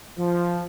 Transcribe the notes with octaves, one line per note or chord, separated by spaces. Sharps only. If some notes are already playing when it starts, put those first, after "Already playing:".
F3